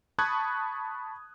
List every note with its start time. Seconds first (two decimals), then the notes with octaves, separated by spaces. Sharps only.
0.19 A5 B5 C#6 D#6 F#6 G#6